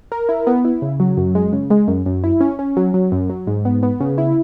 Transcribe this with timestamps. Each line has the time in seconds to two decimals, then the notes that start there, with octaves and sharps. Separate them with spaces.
0.12 A#4
0.29 E4
0.47 B3
0.65 E4
0.82 C#3
1.00 F#3
1.17 F#2
1.35 G#3
1.53 C#3
1.70 G#3
1.88 F#2
2.06 F#2
2.24 E4
2.41 C#4
2.59 C#4
2.77 F#3
2.94 F#3
3.12 F#2
3.30 F#3
3.47 G#2
3.65 B3
3.83 B3
4.01 C#3
4.18 E4